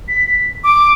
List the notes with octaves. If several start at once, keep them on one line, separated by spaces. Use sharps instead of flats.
B6
D6